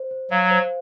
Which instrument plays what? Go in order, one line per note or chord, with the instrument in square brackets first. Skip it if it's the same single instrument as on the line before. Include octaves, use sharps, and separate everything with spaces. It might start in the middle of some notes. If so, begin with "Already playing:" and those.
Already playing: [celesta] C5
C5
[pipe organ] F#3 [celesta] F5
[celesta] C5